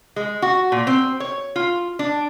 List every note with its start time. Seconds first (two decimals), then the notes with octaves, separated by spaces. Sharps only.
0.16 G#3
0.42 F#4
0.72 A#2
0.87 C4
1.20 C#5
1.56 F4
1.99 D4